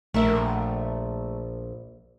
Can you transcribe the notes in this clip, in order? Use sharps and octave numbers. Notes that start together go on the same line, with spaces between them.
A#1 A3 A#4 E5